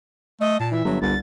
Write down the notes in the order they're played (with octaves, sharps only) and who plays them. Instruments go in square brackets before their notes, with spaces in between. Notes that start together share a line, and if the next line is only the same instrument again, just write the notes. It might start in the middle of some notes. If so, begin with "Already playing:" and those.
[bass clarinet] A3 [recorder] D#5
[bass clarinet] A#2 [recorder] A5
[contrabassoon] E3 [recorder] E5
[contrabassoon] G1 [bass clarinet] F#3
[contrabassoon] G1 [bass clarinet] C2 [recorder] A6